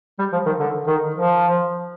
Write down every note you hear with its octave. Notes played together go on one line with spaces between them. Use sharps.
G3
F3
D#3
D3
D#3
F3